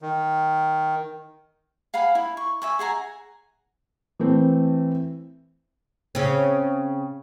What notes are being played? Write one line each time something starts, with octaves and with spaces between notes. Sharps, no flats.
D#3
F5 F#5 G#5 B5
E4
C#6
E5 G#5 C#6
G#4 F#5 G#5 A#5
E3 A3 C4
C#3 C4